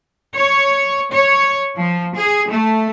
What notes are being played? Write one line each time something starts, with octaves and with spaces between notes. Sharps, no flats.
C#5
C#5
F3
G#4
A3